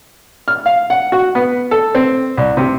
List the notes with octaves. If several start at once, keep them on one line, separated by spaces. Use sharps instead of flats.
F6
F5
F#5
F#4
B3
A4
C4
C2
C3